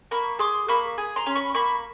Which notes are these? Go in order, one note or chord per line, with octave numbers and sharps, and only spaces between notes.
A#3 B5 C#6
G#4 C6 D6
A#3 B5 C#6
G#4
A#5 C6
C#4
B5 C#6
A#3 B5 C#6